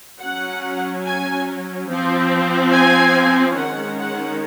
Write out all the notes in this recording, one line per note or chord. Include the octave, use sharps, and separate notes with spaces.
F#3 C#4 F#5
G#5
F3 C4
G#5
D#3 G#3 C#4 F#5
F#5